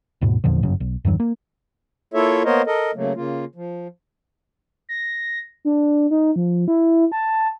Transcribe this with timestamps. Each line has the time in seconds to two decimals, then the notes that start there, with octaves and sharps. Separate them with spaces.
0.21 D#2 G#2 B2
0.44 E2 A#2 D3 F3
0.63 G1 F#2 C#3
0.80 B1
1.05 E2 G2 D#3 F#3
1.20 A#3
2.14 A#3 E4 F4 A4 C#5 E5
2.45 A#3 B3 A#4 C5 C#5 D#5
2.67 A4 A#4 D#5
2.95 C#3 F#3 A3 A#3
3.16 C#3 A#3 F4
3.55 F3
4.89 A#6
5.65 D4
6.11 D#4
6.36 F3
6.68 E4
7.12 A5